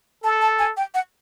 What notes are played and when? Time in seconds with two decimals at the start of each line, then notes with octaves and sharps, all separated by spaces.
0.24 A4 A5
0.41 A5
0.59 G#5
0.77 G5
0.94 F#5